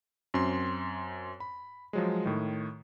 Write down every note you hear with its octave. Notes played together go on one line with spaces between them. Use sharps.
F#2 C4 C6
B5
F3 F#3 G#3
A2 D#3